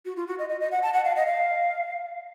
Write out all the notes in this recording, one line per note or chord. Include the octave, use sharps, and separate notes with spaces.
F#4
F4
F#4
D#5
D#5
D#5
F#5
A5
F#5
F5
D#5
F5